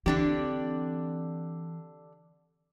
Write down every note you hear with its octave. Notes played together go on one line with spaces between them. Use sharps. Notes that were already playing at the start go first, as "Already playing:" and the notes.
D3 E3 C4 D4 G4